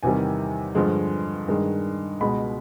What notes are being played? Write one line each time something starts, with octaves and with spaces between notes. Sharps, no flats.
E2 C3 D#3 G3 G#5
G2 D3 F3 G#3
G2 D#3 G#3
C#2 B2 G#3 B5